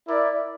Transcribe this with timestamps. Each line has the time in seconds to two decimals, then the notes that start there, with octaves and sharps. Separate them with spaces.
0.08 E4 A#4 D5